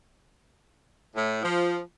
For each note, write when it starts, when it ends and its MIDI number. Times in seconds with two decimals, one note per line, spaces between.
1.16 1.41 45
1.43 1.79 53